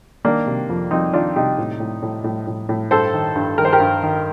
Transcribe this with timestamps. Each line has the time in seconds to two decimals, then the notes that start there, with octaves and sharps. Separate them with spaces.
0.25 D#3 A#3 D4
0.47 C3
0.70 F2
0.91 F2 C4 D#4
1.13 D#3 D4 F4
1.35 C3 D#4 G4
1.58 A2
1.80 A2
2.02 A2
2.24 A2
2.47 A2
2.69 A2
2.91 G2 A4 C5
3.14 D#3
3.36 G2
3.58 D#3 A#4
3.65 C5
3.73 G4 A#4
3.80 G2
4.03 D#3